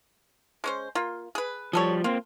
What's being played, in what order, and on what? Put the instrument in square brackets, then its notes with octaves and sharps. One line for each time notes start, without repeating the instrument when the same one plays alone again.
[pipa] G#3 C#4 C5
A#3 F4
G#4 B4
[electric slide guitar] F3 G3 [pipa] G#4 A4 C#5
[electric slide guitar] A#3 C4 [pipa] F4